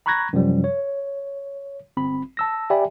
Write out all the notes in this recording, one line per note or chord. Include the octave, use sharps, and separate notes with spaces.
A#5 B5 C#6 F#6 G#6 A#6
F#2 C3 F3 G3
C#5
G1 C4 B5
A5 E6 A#6
G4 D5 E5 G5 G#5 B5